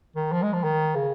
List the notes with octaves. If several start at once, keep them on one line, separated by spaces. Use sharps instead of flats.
D#3
F3
G#3
F3
D#3
C#3